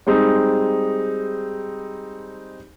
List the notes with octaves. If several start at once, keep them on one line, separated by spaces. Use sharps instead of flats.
G3 G#3 C4 D#4 G#4